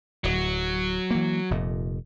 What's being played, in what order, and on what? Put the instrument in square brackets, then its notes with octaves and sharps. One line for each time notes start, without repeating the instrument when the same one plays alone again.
[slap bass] D1 [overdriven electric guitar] F#3
[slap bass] E3 A#3
F1 F2 A#2